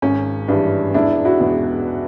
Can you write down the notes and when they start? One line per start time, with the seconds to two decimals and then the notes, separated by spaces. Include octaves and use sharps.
0.02 G#1 C#4
0.48 G2 E3 G3 D4
0.94 E1 D4 E4
1.25 E4 F#4
1.40 E2 B2